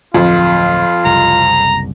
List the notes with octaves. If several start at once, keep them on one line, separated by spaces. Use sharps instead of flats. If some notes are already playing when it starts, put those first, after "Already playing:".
D1 F2 F4
F#1 C2 A#5